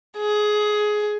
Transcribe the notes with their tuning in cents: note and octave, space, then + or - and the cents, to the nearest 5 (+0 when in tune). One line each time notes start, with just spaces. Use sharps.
G#4 +15